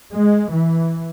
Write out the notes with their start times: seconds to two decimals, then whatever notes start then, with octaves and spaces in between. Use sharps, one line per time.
0.12 G#3
0.52 E3